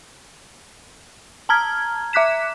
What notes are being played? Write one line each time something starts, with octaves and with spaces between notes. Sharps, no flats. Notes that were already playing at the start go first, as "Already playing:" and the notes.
A5 A#5 F6 G#6
E5 D6 F#6 B6 E7